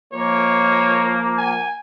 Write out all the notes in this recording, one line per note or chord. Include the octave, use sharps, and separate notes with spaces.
F3 A#3 C#5
G#5